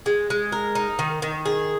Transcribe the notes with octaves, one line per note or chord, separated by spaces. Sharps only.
G#3
G#3
A#4
D#4
D#3
D#3
G#4